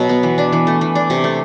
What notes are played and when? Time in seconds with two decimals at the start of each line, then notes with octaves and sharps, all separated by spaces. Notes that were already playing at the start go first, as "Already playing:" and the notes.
Already playing: B2 F#3
0.09 B3
0.23 E3
0.38 D4
0.52 E3
0.67 A3
0.81 E3
0.95 D4
1.10 C3
1.24 A3